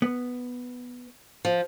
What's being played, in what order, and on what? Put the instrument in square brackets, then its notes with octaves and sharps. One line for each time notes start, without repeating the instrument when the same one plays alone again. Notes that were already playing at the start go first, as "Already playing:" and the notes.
[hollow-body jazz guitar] B3
[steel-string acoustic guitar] F3